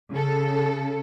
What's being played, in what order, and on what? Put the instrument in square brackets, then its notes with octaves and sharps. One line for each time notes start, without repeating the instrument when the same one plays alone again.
[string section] C#3 A4